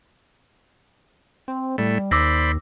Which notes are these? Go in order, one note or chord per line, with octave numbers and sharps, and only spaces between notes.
C4
A2 G3 A3
D#2 C5 D5 B5 D6 E6 A#6